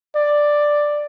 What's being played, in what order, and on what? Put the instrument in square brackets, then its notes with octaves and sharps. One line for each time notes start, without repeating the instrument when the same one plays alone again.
[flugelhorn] D5